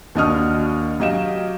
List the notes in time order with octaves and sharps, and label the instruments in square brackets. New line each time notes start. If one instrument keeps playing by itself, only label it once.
[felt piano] D#2 D4 F#4 D#5 D#6 F6
F#3 G4 D#5 F5 E7